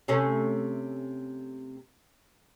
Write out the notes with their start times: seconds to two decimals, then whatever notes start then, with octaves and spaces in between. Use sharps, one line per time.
0.08 C3 A3 C#4